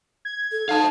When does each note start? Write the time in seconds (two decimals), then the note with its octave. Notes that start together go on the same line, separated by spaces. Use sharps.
0.25 G#6
0.52 A4
0.69 D#4 F5 A5